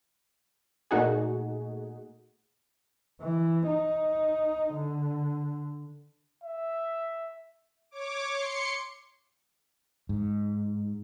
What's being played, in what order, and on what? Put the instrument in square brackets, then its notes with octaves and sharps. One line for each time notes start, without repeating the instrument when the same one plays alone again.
[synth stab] A#2 A3 D#4 F#4 G#4
[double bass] E3
D#4
D3
[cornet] E5
[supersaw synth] C#5 D6
C6 C#7
[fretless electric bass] G#2